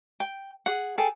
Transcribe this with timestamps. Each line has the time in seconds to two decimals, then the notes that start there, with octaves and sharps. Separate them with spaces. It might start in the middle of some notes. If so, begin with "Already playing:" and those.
0.20 G5
0.66 G#4 F#5
0.98 G#4 A4 G5 G#5